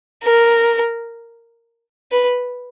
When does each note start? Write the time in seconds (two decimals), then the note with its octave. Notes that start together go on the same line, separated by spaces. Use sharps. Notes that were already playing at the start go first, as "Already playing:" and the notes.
0.24 A#4
2.12 B4